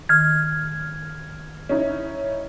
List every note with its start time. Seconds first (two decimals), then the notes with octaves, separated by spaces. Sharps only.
0.09 D#3 F6 G#6
1.69 C#4 D#4 E4